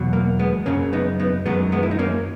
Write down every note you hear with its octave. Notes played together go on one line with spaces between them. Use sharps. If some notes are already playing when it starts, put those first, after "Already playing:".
Already playing: E2 B2 F#3
A#3
G#3 B3
F#2 C#3 F#3 A#3 C#4
B3 D#4
B3 D#4
F#2 D#3 F#3 G#3 B3
G#3 B3
E4
D#4
A#3 C#4